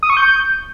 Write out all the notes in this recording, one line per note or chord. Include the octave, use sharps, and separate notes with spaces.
D#6
C#6
G6